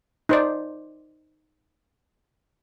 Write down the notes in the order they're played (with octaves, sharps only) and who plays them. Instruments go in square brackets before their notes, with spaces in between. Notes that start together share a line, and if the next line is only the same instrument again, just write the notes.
[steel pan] D#4 C5 D5